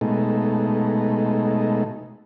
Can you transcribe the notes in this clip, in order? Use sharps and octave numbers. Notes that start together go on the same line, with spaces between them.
B2 G#3 A3 D#4